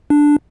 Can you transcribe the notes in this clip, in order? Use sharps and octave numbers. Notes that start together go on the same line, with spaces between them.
D4